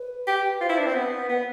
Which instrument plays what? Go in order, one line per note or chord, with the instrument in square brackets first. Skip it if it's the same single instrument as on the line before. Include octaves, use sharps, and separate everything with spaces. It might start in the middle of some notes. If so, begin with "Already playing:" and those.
Already playing: [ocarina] B4
[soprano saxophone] G4
[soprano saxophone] F4 [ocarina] C5
[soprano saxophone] E4
[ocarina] C5
[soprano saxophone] D4
[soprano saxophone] C4 [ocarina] B4
[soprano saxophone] B3
B3